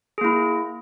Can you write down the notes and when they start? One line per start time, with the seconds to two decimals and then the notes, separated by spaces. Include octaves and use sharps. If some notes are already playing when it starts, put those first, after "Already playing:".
0.18 G#4
0.21 A#3
0.24 E4